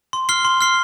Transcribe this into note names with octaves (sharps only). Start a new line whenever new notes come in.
C6
F6 C7 G7
C6
F6 C7 G7